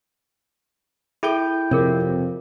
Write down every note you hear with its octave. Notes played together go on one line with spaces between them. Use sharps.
E4 G#4 A4 G5 G6
F2 C3 G#4 A#4 C#5